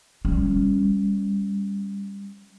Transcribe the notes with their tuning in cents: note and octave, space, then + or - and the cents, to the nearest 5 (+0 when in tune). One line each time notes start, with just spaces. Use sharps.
G3 +25 C#4 +0